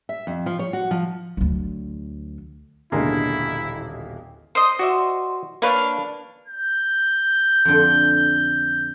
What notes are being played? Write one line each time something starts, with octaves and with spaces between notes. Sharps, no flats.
E5
F2
F3
C#5
F#4
F3
D2 F#3
D#1 A1 B2 D3 G#3 A#3 E4
C5 D#5
F#4 D5 E5
A#3 D4 B4 C#5 F5
G6
F2 D3